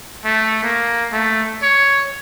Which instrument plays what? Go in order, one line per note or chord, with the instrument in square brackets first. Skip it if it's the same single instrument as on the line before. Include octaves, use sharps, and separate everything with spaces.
[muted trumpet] A3
A#3
A3
C#5